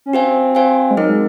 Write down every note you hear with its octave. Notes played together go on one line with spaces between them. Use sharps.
C#4
C4 F#4 C5 F5 G#5
F#4 C5 F5 G#5
G#3
F#3 C4 D#4 A#4 D#5
G#3